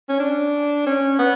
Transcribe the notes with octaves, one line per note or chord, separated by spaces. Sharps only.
C#4
D4
C#4
B3